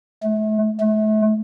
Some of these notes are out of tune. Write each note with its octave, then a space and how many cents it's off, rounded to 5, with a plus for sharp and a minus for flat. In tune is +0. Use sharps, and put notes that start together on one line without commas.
A3 -35
A3 -35